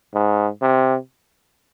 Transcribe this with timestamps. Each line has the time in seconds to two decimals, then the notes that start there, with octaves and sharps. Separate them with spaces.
0.14 G#2
0.62 C3